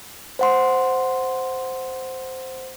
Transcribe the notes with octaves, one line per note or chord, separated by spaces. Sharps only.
C5 F#5 C6